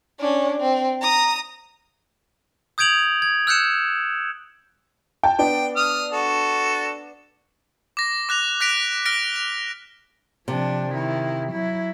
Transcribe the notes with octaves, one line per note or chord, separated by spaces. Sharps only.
C#4 D4
C4
A#5 D#6
D#6 G6 G#6 D7 F7 F#7
G#6
E6 F#6 G6 C#7 E7
G5 A5
B3 D4 G5
D#6 F6
F#4 A4
D6 A#6
D6 F#6 A#6 F7
F#6 A#6 B6 D7 F7
F6 A#6 D7
F7
C3 F3 D4
D#3 E4
F#3 E4